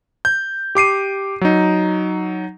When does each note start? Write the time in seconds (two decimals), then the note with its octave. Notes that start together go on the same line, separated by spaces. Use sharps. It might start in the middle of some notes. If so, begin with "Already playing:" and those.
0.25 G6
0.75 G4 D6 C7 D#7
1.41 F#3 D#4